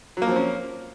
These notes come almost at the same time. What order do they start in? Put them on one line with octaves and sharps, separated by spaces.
F#3 A#3 F3 C4 C#4